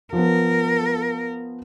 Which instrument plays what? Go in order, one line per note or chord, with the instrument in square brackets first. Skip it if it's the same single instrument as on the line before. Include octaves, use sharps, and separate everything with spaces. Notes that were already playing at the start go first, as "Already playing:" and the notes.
[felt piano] F3 B3 [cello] A#4